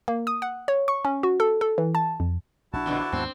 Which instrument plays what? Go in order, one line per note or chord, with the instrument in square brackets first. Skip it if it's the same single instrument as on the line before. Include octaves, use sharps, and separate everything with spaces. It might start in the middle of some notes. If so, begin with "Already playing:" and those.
[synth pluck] A#3
D#6
F#5
C#5
C#6
C#4
F#4
A4
A4
E3
A5
F2
[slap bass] A#1 A#2 D4 [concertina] E4 F#4 A5
[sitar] F2 B2 D3
D3
[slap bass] D#2 G#2 B3 [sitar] C4